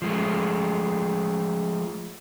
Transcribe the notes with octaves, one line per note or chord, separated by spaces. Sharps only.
F3 G#3 A3